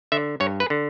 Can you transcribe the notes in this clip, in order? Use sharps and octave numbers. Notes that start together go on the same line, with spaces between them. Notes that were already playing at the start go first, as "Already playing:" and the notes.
D3 E5
G2 C#5
B4
D3